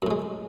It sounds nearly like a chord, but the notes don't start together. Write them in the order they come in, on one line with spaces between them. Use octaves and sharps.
F#2 A2 G#3